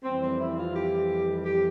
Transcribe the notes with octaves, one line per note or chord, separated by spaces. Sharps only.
F2 E3 G3 C4
C4
E4
F4
G4
G4